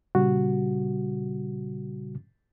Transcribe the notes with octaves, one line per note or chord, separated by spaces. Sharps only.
A#2 C#3 G3 F#4